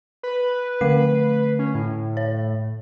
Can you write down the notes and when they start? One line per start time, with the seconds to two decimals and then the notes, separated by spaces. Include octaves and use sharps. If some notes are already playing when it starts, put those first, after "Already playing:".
0.23 B4
0.81 D3 A3 C7
1.59 C#4
1.75 A2
2.17 C#5